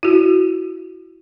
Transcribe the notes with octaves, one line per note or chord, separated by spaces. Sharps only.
E4 F#4